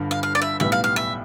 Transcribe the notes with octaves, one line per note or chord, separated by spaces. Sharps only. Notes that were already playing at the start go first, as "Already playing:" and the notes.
Already playing: G1 G2 D3
F5
F5
D5
E5
B1 A2 G3 B3 E5
F5
F5
E5